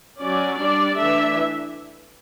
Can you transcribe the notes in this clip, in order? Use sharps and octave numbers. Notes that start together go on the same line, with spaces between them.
F#3 C#4 D5
G3 D4 D5
E3 A3 D4 E5